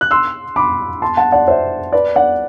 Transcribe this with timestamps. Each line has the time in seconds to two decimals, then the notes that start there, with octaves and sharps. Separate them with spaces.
0.01 F#6
0.11 C6 E6
0.56 B5 D6
1.02 A5 C6
1.17 F#5 A5
1.32 D5 F#5
1.48 C5 E5
1.93 B4 D5
2.16 D5 F#5